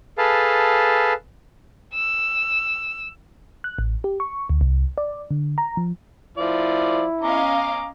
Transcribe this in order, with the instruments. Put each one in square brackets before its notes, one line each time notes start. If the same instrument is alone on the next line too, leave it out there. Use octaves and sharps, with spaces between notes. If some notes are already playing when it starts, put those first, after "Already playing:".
[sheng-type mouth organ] G#4 A4 B4 F5 A5
[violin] E6
[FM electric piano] F#6
A1
G4
C#6
D2
C2
D5
D3
A#5
F3
[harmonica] F3 D5 [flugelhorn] E4
[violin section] C#4 D#5 F5 [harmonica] A#5 D6